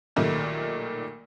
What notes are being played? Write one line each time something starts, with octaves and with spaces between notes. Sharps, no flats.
B1 A#2 D#3 G3 A3 A#3